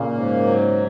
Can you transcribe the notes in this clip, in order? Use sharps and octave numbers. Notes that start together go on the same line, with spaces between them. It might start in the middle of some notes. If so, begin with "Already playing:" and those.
Already playing: A#2 C#3 A#3
G#2
F#3